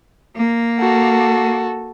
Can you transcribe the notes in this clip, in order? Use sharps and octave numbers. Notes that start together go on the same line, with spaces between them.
A#3
F#4 A4